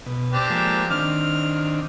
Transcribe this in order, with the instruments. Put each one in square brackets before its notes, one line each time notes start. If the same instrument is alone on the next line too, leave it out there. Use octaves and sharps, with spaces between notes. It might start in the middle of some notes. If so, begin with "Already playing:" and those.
[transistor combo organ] B2
[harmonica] C4 D4 G4
[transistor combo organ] F3 G#3 A#3
[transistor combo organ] D#3 C4 D4 [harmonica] F6